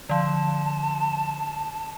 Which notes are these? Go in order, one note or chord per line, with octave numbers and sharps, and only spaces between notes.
D3 F3 A5